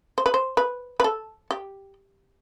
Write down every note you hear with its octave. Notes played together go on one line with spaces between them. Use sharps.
C5
B4
C5
B4
B4
A4
G4